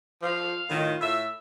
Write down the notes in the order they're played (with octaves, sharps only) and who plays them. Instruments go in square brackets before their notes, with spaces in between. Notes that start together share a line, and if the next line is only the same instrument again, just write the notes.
[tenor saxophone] F3 [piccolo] F5
[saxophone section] A2 D#3 [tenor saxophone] F4
[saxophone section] A2 E5 [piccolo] E6